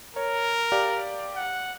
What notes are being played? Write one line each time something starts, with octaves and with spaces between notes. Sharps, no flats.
A#4 C#5
G4 D5 F5
F#5